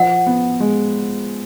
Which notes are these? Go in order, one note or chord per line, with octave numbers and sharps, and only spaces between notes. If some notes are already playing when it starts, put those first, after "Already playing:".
Already playing: F3 F#5
B3
G#3